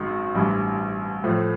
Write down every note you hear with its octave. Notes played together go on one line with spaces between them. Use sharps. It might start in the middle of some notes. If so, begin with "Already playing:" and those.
Already playing: G#1 F#2 D#3 G#3
A1 G2 E3
A2 F3 A3